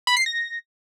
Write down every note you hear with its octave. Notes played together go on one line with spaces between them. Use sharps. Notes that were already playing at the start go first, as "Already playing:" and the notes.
B5
C7
A#6